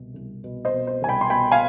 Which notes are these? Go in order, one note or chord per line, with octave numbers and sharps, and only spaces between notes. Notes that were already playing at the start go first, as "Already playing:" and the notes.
Already playing: C2 B2
C2
B2
C5 D#5
B2
C5
C2 G#5
G5 B5
C6
B2 G5 B5
F5 G#5